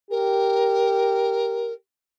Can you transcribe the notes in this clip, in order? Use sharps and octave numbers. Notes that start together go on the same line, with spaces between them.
G4 A#4